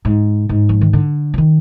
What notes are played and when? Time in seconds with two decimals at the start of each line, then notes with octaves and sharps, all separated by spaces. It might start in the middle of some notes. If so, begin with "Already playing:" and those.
0.05 G#2
0.49 G#2
0.69 F3
0.81 D#3
0.93 D3
1.34 F3
1.38 D#3